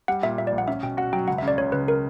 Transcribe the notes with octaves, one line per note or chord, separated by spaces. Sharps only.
G3 F#5
A#2 E5
A#2 E5
D5
A#1
F#5
C#4 E5
B2 G5
F#4 F#5
F#3 G5
C#2 F#5
C#3 E5
D5
C#2 C#5
C#3 B4
A#4